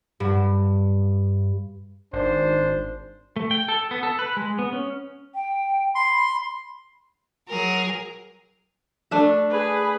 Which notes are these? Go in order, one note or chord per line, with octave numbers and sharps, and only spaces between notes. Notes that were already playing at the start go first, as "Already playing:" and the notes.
G2
G#1 D4 C5
A3
G5
A4
B3
A4
B4
G#3
B3
C#4
G5
B5 C6
F#3 G#4 A#4
A3 D4 E5
G#4 B4